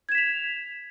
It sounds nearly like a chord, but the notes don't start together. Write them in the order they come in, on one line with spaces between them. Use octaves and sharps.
G#6 E7 B6 F7